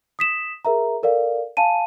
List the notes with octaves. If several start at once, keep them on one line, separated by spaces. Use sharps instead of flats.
D#6 B6 E7
G#4 A#4 E5 A#5
A4 A#4 D5 F5
F5 G#5 A5 D#7